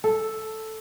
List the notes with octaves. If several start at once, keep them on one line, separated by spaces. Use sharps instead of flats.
A4